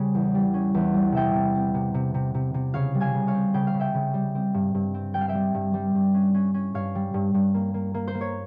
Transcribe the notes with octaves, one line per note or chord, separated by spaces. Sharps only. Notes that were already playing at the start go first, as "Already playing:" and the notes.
Already playing: C#3 G3 G#5
E2
G3
C#4
E2
G3
C3 E5 G5
C3
C4
C3
C3
C3
C3
C3
C#3 C#5 F5
G3
F5 G#5
C#3
C#5 F5
C4
C#3 G5
F5
C#3
E5 G5
C#3
G3
C4
G2
G2
C4
G3 G5
F5
E5 G5
G3
G2
G3
G2
C#4
C#4
C#4
G2 C#5 F5
G3
G2
G2
A#3
A#3
A#3
C5
A#3
C#5